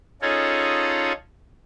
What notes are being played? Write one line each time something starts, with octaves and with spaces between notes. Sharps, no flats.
C#4 D#4 F4 G#4 A4 C#5